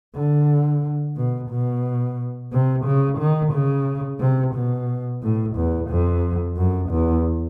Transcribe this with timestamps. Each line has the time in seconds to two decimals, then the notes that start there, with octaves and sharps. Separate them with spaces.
0.15 D3
1.17 B2
1.50 B2
2.52 C3
2.85 C#3
3.19 D#3
3.52 C#3
4.20 C3
4.55 B2
5.22 A2
5.56 E2
5.89 F2
6.57 F#2
6.90 E2